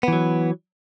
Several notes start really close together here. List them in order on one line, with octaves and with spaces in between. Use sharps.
B3 E3 F#3